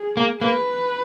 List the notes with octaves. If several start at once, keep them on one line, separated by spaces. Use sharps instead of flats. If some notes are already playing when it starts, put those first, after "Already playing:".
Already playing: G#4
A#3
A#3 B4